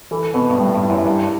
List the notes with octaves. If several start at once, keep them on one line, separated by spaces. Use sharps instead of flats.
E3 A4
B2 B3
G2
A2 G3
G2
E4
F#2
G2 G4